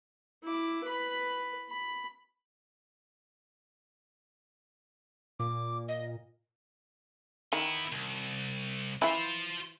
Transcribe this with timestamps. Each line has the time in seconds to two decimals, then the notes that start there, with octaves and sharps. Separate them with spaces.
0.43 E4 D6
0.84 B4 B5
1.69 B5
5.40 A#2 D6
5.88 D#5
7.53 D#3 B3 E4
7.93 C2
9.02 E3 E4 F4 C5